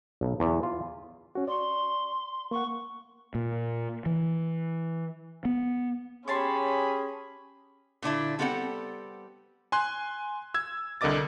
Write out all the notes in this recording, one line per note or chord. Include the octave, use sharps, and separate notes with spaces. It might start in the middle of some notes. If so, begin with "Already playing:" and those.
B1
E2
F4
C#4 F#4
D5 C6 C#6
A#3 F#5 C#6
A#2
E3
B3
C#4 G4 G#4 C#5 A5 B5 C6
A#2 D3 D4 E4
G3 B3 C4 A4 C5 F#5
G#5 C6 F#6
E6 G#6
C2 D3 A#4 D#5 D6 A6